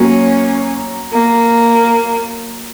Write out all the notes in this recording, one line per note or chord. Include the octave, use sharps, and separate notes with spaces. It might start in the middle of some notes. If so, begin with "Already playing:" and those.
Already playing: F#3 A#3 C#4
A#3